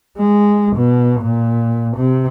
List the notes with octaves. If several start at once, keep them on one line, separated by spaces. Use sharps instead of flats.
G#3
B2
A#2
C3